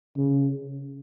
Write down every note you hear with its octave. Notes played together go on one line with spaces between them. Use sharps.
C#3